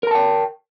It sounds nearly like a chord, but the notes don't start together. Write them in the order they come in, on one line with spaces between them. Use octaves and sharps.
A#4 A#5 A5 G5